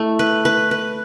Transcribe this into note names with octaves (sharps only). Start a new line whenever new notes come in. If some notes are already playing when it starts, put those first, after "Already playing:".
Already playing: A3 E4
B4
B4
B4